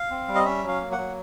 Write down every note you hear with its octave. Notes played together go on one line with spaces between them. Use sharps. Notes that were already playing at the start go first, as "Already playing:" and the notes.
Already playing: F5
C4
G3
D#5
C#4 E5
F#3
F5
A#3
F#5
F#3